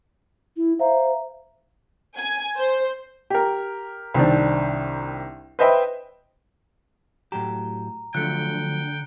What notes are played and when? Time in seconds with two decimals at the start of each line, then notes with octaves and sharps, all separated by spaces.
0.57 E4
0.79 C5 E5 F5 A#5
2.18 G#5
2.58 C5
3.30 G4 A#4
4.14 C2 D#3 C4 D4
5.59 B4 C5 D#5 E5 G5
7.32 A2 F#3 G4 A#5
8.15 D3 F3 F#3 A3 G5 F#6 C#7